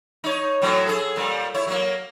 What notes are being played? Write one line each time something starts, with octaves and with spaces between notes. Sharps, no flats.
D#4 C#5
A2 F#3 C4
G#4 A4
A#2 G3
E4 C#5
F#3 A#3